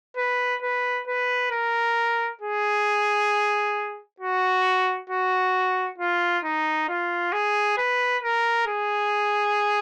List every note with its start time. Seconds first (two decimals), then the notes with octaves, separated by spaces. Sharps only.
0.17 B4
0.62 B4
1.07 B4
1.51 A#4
2.41 G#4
4.20 F#4
5.10 F#4
5.98 F4
6.44 D#4
6.89 F4
7.32 G#4
7.78 B4
8.23 A#4
8.67 G#4